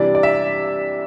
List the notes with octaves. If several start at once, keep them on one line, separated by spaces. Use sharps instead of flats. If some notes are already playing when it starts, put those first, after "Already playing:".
Already playing: C3 E3 G3 D4 D5
D5
E5